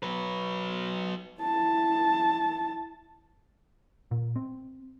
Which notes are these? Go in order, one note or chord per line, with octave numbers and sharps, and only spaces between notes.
F#3 B4
E4 A5
A#2
C4